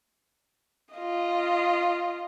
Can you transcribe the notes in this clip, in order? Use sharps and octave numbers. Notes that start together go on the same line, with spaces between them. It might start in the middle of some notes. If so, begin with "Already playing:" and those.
F4 D#5